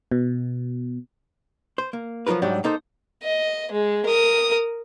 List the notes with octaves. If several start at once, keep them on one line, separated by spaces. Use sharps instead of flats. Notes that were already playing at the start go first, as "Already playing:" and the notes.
B2
C5
A#3
F3 F#3 F4 A#4 B4
G#2 F#3 G3 D4 F#4 G4
A#3 D#4 A4 C5
D#5
G#3
A#4 D#6